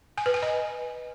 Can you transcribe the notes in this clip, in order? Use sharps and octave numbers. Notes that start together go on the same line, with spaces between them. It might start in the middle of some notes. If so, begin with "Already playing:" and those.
G#5
B4
G#5
D#5